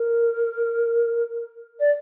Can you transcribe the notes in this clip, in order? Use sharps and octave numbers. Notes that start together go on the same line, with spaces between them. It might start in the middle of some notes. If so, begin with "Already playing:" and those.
Already playing: A#4
D5